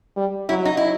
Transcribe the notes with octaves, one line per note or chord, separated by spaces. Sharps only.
G3
F#3 E4
D#4
E4